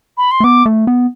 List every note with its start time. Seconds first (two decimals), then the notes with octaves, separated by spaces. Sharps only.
0.17 B5
0.31 C6
0.40 A3
0.44 B3 D6
0.66 A3
0.87 B3